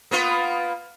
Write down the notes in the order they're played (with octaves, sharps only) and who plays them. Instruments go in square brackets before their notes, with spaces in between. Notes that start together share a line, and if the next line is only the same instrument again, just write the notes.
[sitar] A#3 B3 F4